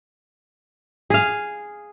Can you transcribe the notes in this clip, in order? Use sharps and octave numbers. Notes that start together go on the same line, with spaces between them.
G#4 F5